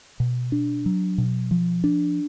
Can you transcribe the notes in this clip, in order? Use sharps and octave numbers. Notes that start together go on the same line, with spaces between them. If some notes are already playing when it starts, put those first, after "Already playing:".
B2
D4
F#3
B2
F3
D4